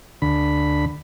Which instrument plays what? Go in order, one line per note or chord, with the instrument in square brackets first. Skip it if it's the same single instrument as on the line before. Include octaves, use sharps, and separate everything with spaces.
[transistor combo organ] D2 D3 B5